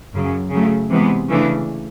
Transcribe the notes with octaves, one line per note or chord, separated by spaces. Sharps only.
F#2 C#3 F#3
C#3 F#3 A3
C3 E3 G#3 B3
C#3 E3 A3 D4